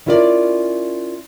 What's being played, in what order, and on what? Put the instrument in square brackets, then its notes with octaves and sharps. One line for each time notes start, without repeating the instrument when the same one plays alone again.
[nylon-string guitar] C#4 E4 F4 A#4 C#5 D5